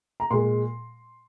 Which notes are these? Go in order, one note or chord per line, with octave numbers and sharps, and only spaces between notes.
A#5
A#2 G#3 C6